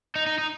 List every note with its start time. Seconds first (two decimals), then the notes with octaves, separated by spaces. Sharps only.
0.16 D#4
0.27 D#4
0.38 D#4